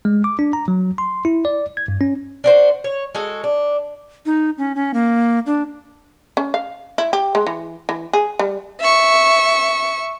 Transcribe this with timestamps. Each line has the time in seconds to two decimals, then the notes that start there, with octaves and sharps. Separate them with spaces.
0.05 G#3
0.24 D6
0.39 D4
0.53 A#5
0.68 F#3
0.98 C6
1.25 E4
1.45 D5
1.77 G#6
1.88 G2
2.01 C#4
2.44 D4 F#4 C5
2.84 C#5
3.15 G#3 F#4 A4
3.44 D4
4.26 D#4
4.58 C#4
4.76 C#4
4.94 A#3
5.46 D4
6.37 C#4
6.54 F5
6.98 E4
7.13 G4
7.35 G#3
7.47 E3
7.89 E3
8.13 G#4
8.39 G3
8.80 E5 C#6